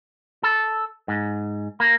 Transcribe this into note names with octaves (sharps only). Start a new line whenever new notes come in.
A4
G#2
A#3